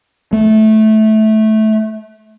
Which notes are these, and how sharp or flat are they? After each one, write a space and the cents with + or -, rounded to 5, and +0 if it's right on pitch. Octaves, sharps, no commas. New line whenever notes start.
A3 -15